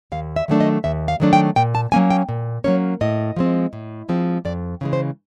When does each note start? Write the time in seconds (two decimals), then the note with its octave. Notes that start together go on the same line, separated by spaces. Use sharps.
0.12 D#2 F5
0.36 E5
0.48 D#3 F#3 A3 D4
0.60 D#5
0.84 D#2 E5
1.08 F5
1.20 D#3 F#3 A3 D4
1.33 G5
1.56 A#2 G5
1.75 A5
1.92 F#3 A#3 C#4 G#5
2.10 G5
2.29 A#2
2.64 F#3 A#3 C#4 C#5
3.01 A2 D#5
3.36 F3 G#3 C4
3.73 A2
4.09 F3 G#3 C4
4.45 F2 D5
4.81 C#3 E3 G#3
4.93 C5